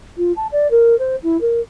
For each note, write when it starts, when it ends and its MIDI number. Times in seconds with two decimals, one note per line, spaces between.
0.17 0.32 65
0.36 0.47 81
0.52 0.70 74
0.71 0.98 70
0.99 1.16 72
1.23 1.40 64
1.41 1.60 70